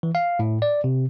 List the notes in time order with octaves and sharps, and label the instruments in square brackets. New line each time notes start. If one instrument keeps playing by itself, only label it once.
[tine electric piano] E3
F5
A2
D5
C3